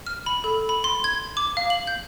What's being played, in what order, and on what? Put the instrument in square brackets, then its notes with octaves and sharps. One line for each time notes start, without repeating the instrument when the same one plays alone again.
[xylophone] F6
B5
A4
B5
C6
G#6
D6
F5
F#7
G6